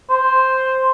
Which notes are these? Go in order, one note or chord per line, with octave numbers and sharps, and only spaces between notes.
C5